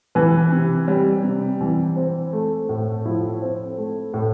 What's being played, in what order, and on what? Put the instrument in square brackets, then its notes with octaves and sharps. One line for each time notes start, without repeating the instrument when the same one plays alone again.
[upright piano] E3 B4
C3
G3
C3
E3
C4
A3
A2
F3 E4
C4
A3
A2